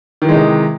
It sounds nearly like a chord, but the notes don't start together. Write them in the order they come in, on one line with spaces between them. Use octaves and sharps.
D#3 E3 G#3 D#4 C3